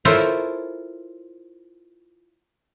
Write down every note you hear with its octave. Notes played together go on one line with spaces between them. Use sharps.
E4 F4 A4 A#4 C5 C#5